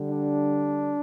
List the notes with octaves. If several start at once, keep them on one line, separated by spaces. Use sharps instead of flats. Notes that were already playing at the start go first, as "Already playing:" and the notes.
Already playing: D3 G3
D4